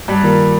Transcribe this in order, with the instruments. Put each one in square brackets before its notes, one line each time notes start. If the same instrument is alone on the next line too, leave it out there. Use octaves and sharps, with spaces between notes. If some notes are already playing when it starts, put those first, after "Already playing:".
[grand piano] G2 G3
[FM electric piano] D#3 A#3 F4 A#4